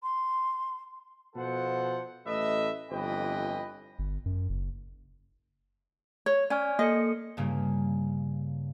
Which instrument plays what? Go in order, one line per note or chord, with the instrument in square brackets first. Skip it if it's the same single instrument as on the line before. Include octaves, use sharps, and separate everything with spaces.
[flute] C6
[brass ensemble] B2 F3 A4 C5 F#5
A1 A3 B4 D#5 E5
G1 F2 E3 B4 D#5 G5
[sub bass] G1
F#2
F#1
[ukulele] C#5
[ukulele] C#4 [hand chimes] D5 G#5 F6
[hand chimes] A#3 A4 C#7 [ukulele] D#5
[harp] G2 C#3 A#3